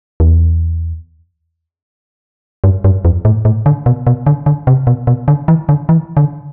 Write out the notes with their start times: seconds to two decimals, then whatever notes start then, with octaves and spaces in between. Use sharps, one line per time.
0.20 E2
2.64 G2
2.84 G2
3.05 F2
3.25 A2
3.45 A2
3.66 D3
3.86 B2
4.07 B2
4.27 D3
4.46 D3
4.67 C3
4.87 B2
5.07 B2
5.28 D3
5.48 E3
5.69 D3
5.89 E3
6.17 D3